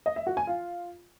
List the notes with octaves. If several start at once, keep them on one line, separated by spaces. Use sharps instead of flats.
D#5
E5
F#4
G#5
F4